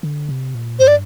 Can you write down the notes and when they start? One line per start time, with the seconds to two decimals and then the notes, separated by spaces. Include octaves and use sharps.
0.03 D3
0.29 C3
0.55 A#2
0.79 G2 C5
0.88 D5